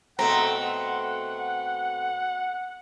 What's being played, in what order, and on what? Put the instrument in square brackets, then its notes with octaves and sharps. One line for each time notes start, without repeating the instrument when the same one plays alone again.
[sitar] B2 A3 C4 [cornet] F#5 [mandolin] A#5